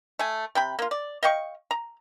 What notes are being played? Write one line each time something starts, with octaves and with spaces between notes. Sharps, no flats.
A3 G#5
C3 G5 B5
A#3 F4
D5
D#5 F5 G5 C#6
A#5